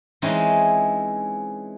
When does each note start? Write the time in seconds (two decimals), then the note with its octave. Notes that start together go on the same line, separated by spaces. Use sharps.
0.22 E3 G#3 C4 C#4 D#4